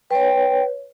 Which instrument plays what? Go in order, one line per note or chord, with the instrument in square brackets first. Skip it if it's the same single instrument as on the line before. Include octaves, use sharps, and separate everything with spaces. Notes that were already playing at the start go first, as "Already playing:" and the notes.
[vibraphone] B4 C#5 [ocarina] G5